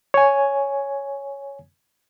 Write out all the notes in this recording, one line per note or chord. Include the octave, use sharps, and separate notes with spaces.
C#5 G#5